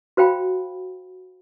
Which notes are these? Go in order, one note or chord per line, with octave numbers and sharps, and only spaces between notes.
F#4 C5 F5 G5 B5